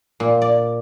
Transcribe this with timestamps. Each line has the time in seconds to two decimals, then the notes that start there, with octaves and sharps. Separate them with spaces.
0.20 A#2
0.42 D5